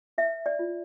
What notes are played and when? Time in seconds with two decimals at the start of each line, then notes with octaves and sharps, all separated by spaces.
0.18 B4 E5
0.46 D5
0.59 F4